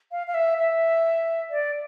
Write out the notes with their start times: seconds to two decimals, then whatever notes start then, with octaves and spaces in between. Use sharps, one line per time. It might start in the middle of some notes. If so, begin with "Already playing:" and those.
0.12 F5
0.27 F5
0.34 E5
0.57 E5
1.50 D5